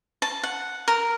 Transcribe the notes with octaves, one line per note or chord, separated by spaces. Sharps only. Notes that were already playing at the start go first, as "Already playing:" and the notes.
A5
F#5
A#4